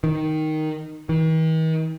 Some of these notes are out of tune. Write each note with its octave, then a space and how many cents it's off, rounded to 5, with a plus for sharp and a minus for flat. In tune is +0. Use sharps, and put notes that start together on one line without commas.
D#3 +0
D#3 +45